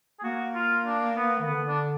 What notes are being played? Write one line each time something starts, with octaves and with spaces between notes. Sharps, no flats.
G#4
A#3 F#4
F4
D4
B3
D#3
D3 B3
D4